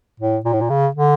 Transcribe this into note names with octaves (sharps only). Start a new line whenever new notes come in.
A2
A#2
A2
A#2
C#3
D3